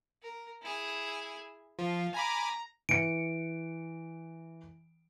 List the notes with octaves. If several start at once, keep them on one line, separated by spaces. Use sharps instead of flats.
A#4
E4 G#4
F3 F4
G#5 A#5 B5 D6
E3 C#7 D7